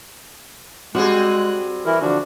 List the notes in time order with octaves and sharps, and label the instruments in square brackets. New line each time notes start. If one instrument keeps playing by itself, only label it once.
[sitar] G3 C4 G#4 [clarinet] G#3 [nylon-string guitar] F#4 [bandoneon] F#6
[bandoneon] E3 E4 [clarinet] A#4
[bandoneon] D3 F3 D4 [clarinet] F#4